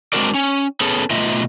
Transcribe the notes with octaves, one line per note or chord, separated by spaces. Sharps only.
G#3 C4 D4 F#4 A#4 D5
C#4
B3 C#4 G#4 A4
B2 A3 F4 D#5 E5